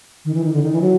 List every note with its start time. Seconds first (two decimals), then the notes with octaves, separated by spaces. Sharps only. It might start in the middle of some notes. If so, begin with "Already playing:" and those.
0.25 D#3
0.34 E3
0.44 D#3
0.53 D3
0.63 D#3
0.72 E3
0.82 F#3